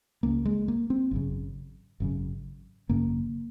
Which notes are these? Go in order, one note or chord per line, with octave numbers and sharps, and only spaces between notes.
C#2 C#3 A#3
G#3
A#3
C4
G#1 F#2 C#3
G#1 F#2 C#3
G#1 F#2 C#3 A#3